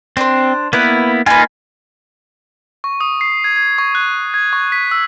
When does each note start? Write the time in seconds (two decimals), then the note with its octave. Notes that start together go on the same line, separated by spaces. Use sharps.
0.17 C4 D4 C5
0.73 A#3 B3 E4 B4
1.26 A#3 D#4 F4 B4 G#5
2.84 C#6
3.01 D#6
3.21 C7
3.44 G#6
3.56 G#6
3.78 C#6
3.95 F#6
4.34 G#6
4.53 C#6
4.72 B6
4.91 E6